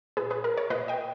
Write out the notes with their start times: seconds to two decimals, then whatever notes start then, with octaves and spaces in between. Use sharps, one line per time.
0.17 A#2 G#4 B4
0.30 G#4 B4
0.44 A#4
0.57 A#4 C#5
0.70 A#2 B4 D#5
0.88 D#5 G5